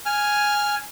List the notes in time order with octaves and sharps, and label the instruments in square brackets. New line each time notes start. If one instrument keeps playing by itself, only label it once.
[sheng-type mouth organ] G#5 F6